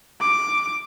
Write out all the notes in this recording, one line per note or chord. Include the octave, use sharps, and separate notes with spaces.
D6